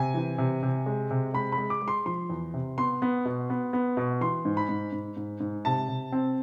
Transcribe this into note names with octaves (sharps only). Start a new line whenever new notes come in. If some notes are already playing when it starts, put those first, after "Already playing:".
Already playing: C3 G#5
E3
C3
C3
G#3
C3
G#3 B5
B5
G#3
D6
G#3
C6
F3 C6
E2
C3
B3 C6
B3
B2
B3
B3
B2
E3 C6
G#2
B5
G#2
G#2
G#2
G#2
C3 A5
C3
C4